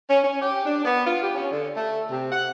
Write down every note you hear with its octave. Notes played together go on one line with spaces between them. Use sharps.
C#4
C#4
G4
D4
B3
F4
G4
C#4
D3
A3
C3
F#5